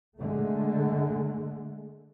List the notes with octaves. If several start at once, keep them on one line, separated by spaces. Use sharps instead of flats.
D3 G#3 A3